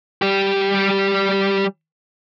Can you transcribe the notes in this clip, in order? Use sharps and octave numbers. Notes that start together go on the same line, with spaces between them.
G3 G4